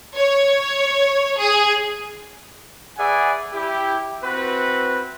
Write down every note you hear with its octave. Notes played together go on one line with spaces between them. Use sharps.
C#5
G#4
G#4 B4 D5 E5 F#5 G#5
E4 G4
C4 E4 F#4 B4